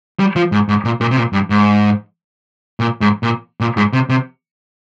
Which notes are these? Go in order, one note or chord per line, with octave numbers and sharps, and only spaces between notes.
G3
F3
G#2
G#2
A#2
A#2
C3
A#2
G2
G#2
A#2
G#2
A#2
A#2
G#2
C3
C3